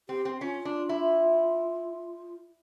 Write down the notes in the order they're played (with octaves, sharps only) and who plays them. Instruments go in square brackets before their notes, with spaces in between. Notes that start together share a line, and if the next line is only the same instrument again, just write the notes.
[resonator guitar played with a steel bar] C4 [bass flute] G4
[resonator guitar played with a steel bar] C4
[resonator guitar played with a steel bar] C#4 [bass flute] F4
[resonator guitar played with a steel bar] D4
E4